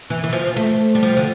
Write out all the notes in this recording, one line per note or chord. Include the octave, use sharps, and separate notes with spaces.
E3
E3
F3
A3
G3
F3
D3